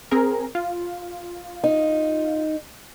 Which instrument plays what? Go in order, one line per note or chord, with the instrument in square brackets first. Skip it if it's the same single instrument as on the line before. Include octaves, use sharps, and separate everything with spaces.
[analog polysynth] C4 G#4 A#4
F4
[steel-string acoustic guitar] D#4